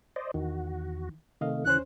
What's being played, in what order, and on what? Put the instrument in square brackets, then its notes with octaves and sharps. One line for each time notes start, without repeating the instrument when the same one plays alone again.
[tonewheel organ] C5 D5 D#5
[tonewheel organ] E2 F#4 [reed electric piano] D#3 E3
[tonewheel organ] C3 A3 [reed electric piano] D#3 D#5 F5
[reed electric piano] D#2 C#4 C5 [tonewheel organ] C#3 E3 [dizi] F#6